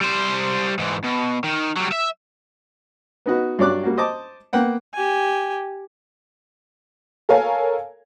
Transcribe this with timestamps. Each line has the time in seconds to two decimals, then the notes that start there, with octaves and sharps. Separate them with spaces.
0.01 G3 C5
0.79 G#2 E3
1.04 B2
1.44 D#3
1.77 F#3 G3
1.92 E5
3.26 B3 D#4 F#4 B4
3.59 G2 F#3 C#5 D5 D6 F#6
3.83 G3 A#3 F#4
3.97 C5 D#5 A5 D6
4.53 A#3 B3 F#5 G5
4.94 G4 G#5
7.29 A4 A#4 C#5 F5 G#5